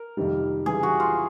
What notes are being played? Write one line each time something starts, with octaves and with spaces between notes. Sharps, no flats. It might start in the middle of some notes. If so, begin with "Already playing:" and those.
Already playing: A#4
F2 C3 D#3 G3
C#3 E3 G3 G#4
F#4
F4